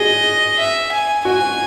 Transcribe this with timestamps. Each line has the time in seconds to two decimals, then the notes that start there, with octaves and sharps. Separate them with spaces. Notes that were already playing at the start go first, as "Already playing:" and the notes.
Already playing: F#4 G#4 D#5
0.60 E5
0.93 G#5
1.25 F#4 G#5